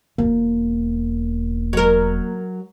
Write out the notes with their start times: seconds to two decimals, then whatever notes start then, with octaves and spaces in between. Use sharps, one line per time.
0.18 E1 A#3
1.73 F#3 A#4